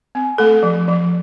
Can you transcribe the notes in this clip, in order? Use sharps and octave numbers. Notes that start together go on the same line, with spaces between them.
C4
A3 A4
F3
F3